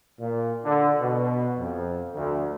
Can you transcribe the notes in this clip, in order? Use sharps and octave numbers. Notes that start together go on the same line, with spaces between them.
A#2
D3
B2
F2
D2